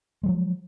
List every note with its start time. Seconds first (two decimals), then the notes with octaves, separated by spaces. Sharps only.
0.23 G#3
0.26 F#3
0.28 F3